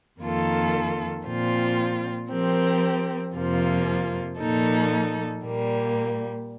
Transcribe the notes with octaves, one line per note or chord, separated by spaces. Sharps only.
F2 D#3 A#3 F4 A4
A#2 F3 C4 F4
F3 C4 G4 A#4
F2 C3 F3 A#3 F4
A#2 F3 A#3 D#4 A4
A#2 G3 A#3